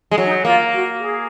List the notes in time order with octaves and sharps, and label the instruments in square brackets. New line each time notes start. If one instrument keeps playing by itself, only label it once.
[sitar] G#3
F#3
[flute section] D#4
[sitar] A#3 [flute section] F4
[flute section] F#4
G#4